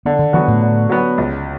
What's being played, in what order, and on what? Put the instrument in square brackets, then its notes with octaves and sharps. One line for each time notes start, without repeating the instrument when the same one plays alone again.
[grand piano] D3 [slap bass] B3
[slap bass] D3
[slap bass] E3 [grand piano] F#3 B3 F#4
[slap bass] A2
[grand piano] D3
F#3 B3 F#4
C#2